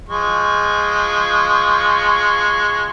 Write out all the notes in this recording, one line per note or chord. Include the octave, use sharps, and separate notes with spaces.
F3 G#3 C#6